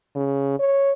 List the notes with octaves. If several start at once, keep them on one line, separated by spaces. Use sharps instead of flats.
C#3
C#5